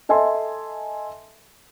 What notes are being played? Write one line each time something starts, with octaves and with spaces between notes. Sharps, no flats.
A4 D#5 E5 G#5 A5 C6